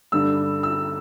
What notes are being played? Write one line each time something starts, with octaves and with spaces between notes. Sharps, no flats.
G2 D3 G3 E6
E6